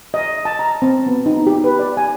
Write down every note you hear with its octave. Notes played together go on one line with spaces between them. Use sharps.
D#5
A5
A#5
C4
B3
D#4
G4
B4
D5
G#5